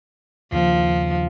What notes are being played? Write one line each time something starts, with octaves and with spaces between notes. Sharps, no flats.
D#2 C#3 F3 A#3